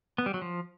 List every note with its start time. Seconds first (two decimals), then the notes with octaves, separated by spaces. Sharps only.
0.18 B3
0.26 G3
0.34 F#3
0.42 F3